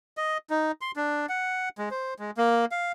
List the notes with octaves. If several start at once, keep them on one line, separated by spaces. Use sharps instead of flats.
D#5
D#4
C6
D4
F#5
G#3
C5
G#3
A#3
F5